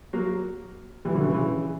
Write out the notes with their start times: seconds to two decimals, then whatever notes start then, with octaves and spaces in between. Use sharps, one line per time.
0.13 F#3 A#3
1.05 E3 G3
1.14 D3 F#3
1.24 C#3 E3
1.34 C#3 E3